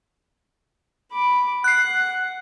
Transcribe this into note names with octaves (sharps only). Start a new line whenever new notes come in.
B5 D6
F#5 F#6 C7